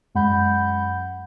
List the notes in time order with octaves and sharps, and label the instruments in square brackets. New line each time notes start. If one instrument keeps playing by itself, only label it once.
[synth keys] F#2 G#3 F#5 B5 G6